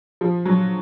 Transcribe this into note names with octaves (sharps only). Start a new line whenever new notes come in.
F3
F#3